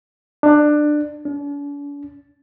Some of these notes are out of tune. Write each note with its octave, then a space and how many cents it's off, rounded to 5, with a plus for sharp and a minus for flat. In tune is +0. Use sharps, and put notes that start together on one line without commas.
D4 +20
D4 -45